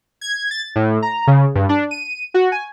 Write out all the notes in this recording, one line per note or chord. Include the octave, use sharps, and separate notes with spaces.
G#6
A6
A2
A#5
C#3
G2
D4
D#7
F#4
G#5